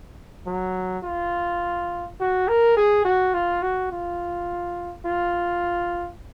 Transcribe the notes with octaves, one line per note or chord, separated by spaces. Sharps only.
F#3
F4
F#4
A#4
G#4
F#4
F4
F#4
F4
F4